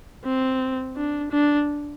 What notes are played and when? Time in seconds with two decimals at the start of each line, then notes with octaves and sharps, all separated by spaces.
0.25 C4
0.96 D4
1.32 D4